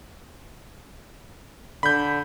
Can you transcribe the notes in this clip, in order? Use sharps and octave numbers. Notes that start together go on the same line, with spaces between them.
D3 B5 G6